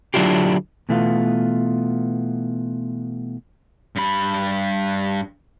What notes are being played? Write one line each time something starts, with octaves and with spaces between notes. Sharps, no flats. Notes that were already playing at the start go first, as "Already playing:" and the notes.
D3 F#3 D4 E4 F4 G4
B2 E3 A3 B3 E4 F4
G2 B5